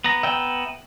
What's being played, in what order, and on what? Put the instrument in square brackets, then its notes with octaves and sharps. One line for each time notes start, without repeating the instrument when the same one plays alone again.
[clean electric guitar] B3 A#5
[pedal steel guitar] E5 G5